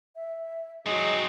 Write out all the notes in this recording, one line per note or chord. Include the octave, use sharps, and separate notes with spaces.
E5
G2 F#3 G#3 C4 D#4 D#6